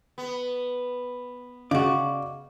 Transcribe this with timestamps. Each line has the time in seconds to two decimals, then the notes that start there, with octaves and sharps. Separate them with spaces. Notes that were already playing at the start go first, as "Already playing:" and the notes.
0.18 B3
1.71 C#3 F#4 D5 D#5 F5 D6